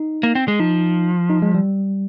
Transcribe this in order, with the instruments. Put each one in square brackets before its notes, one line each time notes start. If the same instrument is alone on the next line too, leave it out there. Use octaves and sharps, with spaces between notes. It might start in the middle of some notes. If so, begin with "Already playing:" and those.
Already playing: [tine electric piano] D#4
[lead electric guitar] A#3
C4
G#3
[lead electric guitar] F3 [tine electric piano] D#4
[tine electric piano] D#4
G#3
G3